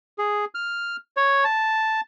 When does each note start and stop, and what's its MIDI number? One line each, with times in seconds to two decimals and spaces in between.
0.18 0.45 68
0.55 0.96 89
1.17 1.44 73
1.44 2.01 81